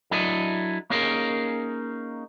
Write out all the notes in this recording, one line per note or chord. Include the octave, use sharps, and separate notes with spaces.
F#3 D4 E4 A4 D#5
A#3 C#4 D#4 G#4 A#4